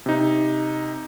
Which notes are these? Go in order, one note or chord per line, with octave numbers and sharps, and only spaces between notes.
C3 D#4